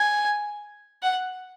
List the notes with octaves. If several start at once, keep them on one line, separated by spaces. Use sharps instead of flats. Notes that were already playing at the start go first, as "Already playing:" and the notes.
Already playing: G#5
F#5